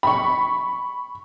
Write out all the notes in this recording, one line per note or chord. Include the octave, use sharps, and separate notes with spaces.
B5 C#6